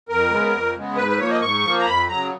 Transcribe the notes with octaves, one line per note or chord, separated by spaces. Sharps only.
F2 A#4
C#3 G#3 B3
F2
C#3 G#3 B3
G#2 B4
B4
F3 A#3 C#5
D#5
G#2 C#6
F3 A#3
A#5
F2 B5
C#3 F#3 A#5